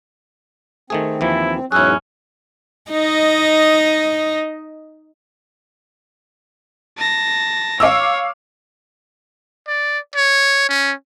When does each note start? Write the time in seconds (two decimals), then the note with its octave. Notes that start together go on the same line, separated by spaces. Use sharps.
0.90 D#3 A3 C4 G#4
1.21 D#2 E3 F3 E4
1.72 E2 G#2 F#3 C#4 E4 G#4 E6 F#6
2.91 D#4 D#5
6.97 A5 A#6
7.80 C#5 F5 D6 E6
9.68 D5
10.16 C#5
10.69 C#4